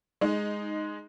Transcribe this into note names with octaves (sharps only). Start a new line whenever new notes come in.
G#3 D#4